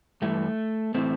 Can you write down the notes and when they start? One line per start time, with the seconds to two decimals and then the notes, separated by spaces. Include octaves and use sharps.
0.22 G2 E3 A3
0.94 A2 E3 A3 C4